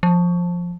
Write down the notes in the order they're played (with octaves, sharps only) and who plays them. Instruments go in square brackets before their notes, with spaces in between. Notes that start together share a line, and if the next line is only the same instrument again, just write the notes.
[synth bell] F3